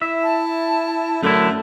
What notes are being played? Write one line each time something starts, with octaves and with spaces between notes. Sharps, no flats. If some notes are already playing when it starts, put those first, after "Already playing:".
E4 E5
A5
F#2 D3 A3 E4